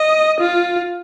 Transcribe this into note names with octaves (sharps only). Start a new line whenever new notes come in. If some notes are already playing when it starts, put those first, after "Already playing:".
Already playing: D#5
F4